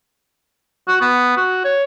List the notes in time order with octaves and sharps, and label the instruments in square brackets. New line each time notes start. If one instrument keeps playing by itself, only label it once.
[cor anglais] F#4
B3
F#4
C#5